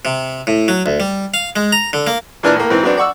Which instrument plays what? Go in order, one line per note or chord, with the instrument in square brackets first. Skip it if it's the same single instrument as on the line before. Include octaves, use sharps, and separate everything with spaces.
[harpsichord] C3
A2
F#3
D2
G3
F5
G#3
A#5
D3
A#3
[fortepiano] A#2 E3 D4 A5 F6 F#6
A2 A#3
G#2 E3 C4
F#3 B3 C4 D4
D5 F#5 C#6 E6